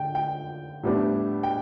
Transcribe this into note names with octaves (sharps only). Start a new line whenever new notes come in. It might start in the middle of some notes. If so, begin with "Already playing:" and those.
Already playing: D3 G5
G5
A2 G3 B3 D4
G5